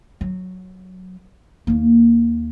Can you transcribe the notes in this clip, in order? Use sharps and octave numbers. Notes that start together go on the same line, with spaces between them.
F#3
D#2 A#3